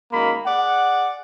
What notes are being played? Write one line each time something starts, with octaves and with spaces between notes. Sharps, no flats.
F#2 D#3 G#3 A#3 B5
G#4 D5 F#5